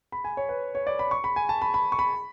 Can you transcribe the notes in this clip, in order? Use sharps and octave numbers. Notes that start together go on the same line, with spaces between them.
B5
G#5
C#5
B4
C#5
D5
B5
C#6
B5
G#5
A5
B5
B5
C#6
B5